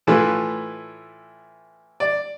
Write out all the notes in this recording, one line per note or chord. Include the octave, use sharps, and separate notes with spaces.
A2 E3 A3 F4 B4
D5